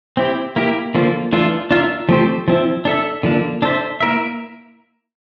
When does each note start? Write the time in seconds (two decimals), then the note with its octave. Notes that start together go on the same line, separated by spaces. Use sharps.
0.17 C4 E4 G4
0.56 A#3 E4 G4
0.95 D3 F3 A#3 F4
1.32 E3 A3 D4 F4 A4
1.71 D4 F4 A#4 E5
2.09 F3 A3 C4 G4 C5
2.48 F3 C4 E4
2.85 D4 A4 E5
3.23 D3 F3 A#3 D4
3.62 D4 A4 C5 E5
4.00 A#3 E4 A#4 E5